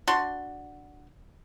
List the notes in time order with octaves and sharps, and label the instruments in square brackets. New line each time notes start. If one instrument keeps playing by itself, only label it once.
[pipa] D4 F#4 C6